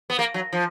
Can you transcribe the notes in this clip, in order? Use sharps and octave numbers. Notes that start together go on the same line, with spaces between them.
B3
A#3
F#3
F3